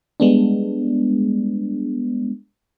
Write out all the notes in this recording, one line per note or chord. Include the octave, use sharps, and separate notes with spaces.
G3 G#3 B3 D4